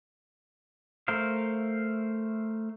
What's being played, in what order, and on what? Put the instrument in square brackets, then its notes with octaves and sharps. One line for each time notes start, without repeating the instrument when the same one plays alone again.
[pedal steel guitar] A3 A#4 C5 F5